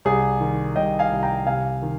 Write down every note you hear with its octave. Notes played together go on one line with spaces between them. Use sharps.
C2 G#4
D#3
C2 D#5 G5
F5 G#5
C2
G5 A#5
C3 F5 G#5
D#3